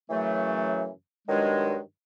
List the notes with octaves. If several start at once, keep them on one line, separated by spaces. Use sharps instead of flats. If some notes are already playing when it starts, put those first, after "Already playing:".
F#2 C#3 E3 F#3 A3
G2 D#3 F#3 G#3